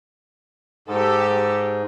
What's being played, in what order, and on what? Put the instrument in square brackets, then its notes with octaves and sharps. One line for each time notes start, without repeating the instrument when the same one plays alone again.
[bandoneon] G#2 [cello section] G4 A4